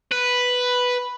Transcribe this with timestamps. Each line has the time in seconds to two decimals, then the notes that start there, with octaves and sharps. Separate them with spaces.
0.11 B4